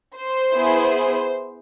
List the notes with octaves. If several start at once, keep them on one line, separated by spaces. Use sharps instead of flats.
C5
B3 E4 G#4